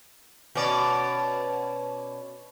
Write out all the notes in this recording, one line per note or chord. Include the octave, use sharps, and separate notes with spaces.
B2 C#4 D5